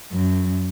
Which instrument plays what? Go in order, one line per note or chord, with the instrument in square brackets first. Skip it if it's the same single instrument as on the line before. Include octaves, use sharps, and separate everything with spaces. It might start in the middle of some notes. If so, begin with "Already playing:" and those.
[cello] F#2